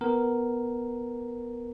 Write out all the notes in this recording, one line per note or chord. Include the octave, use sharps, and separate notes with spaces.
B3 A#4